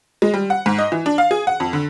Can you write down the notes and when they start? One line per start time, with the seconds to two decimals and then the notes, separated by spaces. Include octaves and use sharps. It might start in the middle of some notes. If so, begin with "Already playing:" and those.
0.22 G#3
0.34 G3
0.50 F#5
0.66 G#2
0.78 D#5
0.92 E3
1.06 D4
1.18 F5
1.31 G#4
1.47 F#5
1.60 F2
1.73 D3